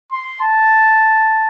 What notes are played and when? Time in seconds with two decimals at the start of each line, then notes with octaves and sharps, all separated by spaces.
0.12 C6
0.41 A5